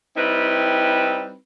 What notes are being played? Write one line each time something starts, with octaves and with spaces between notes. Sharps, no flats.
G3 C4 D#4 E4 B4